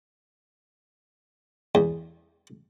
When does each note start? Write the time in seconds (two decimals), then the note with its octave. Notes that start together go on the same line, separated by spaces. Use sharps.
1.75 E2